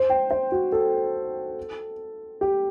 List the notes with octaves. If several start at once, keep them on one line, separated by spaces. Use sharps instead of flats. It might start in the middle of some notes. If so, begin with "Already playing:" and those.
Already playing: C5
G5
C5
F#4
A4
G4